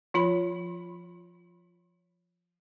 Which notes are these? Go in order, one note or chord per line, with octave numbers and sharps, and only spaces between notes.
F3 F4 B5